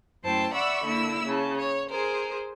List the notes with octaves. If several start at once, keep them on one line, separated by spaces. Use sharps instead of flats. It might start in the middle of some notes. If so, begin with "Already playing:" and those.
F#2 A3 E4 C5 G5 A5
D5 E5 F#5 B5 C#6 E6
D3 A#3 E4 E6
C#3 A5
C#5
G#4 A#4 C5